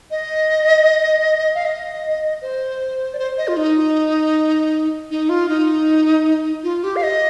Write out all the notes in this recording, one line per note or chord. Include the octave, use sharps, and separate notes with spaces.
D#5
F5
D#5
C5
D5
C5
D#5
F4
D#4
D#4
F4
D#4
F4
G4
F5
D#5